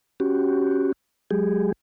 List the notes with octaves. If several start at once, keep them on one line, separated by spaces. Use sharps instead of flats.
C#4 F#4 G4
F#3 G#3 G4 G#4